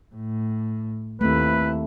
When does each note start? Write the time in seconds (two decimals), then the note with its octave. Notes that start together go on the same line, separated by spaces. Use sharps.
0.15 A2
1.21 D#2 A3 C4 E4 B4